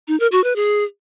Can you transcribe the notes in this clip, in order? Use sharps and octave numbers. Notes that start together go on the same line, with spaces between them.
D#4
A#4
F#4
B4
G#4